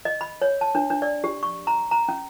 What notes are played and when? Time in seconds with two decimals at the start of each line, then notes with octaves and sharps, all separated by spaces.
0.05 D#5
0.21 B5
0.42 C#5
0.61 A5
0.75 D4
0.90 D4
1.02 D5
1.24 G4
1.43 C#6
1.67 A#5
1.91 A#5
2.08 C#4